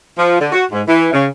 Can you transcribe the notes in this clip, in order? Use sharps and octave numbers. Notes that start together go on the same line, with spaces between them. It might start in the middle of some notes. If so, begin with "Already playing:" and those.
F3
D3
F#4
G#2
E3
C#3